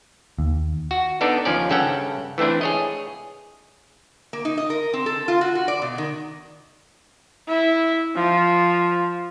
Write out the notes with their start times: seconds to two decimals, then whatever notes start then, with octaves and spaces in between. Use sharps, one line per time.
0.39 D#2
0.91 F#4
1.21 B3 D4 D#4 A4 D5
1.45 D#2 F3 C#4 D5
1.69 G2 C#3 C#4 A4 F#5 G5
2.38 E3 A3 C4 D4 E4
2.61 G#4 C#5 D#5
4.33 A#3
4.45 D#4
4.58 D#5
4.70 A#4
4.93 C4
5.06 A4
5.28 F4
5.41 F#4
5.55 F#4
5.68 D5
5.82 B2
5.98 D#3
7.48 E4
8.16 F3